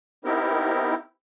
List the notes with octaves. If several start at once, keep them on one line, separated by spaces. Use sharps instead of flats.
B3 C4 D#4 E4 G4 A#4